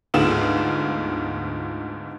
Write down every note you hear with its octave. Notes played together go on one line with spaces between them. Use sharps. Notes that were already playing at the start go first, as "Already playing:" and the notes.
D2 G#2 B3 F4 E7 F#7